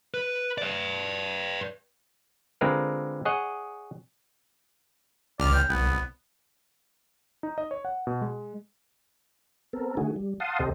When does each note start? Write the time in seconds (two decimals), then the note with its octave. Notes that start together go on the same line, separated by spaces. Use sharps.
0.14 B4
0.58 B4 D5
2.61 D3 G#3 C4 F4 A#4 B4
3.25 G#4 C#5 D#5 F#5
5.40 C#2 D5 F6
5.54 G5
5.70 C2 B3
7.43 D#4
7.58 D#5
7.71 C#5
7.85 F#5
8.07 B2
8.22 G#3
9.73 B3 C4 A4 A#4
9.97 D3 D#3 A3 F#4 G#4
10.16 G3
10.40 F5 F#5 A5 C6 D#6
10.59 D#2 C3 G4 A4 C5 D#5